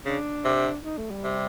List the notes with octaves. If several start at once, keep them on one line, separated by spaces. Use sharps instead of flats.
C#3 D4
C3
D#4
A3
G3
C3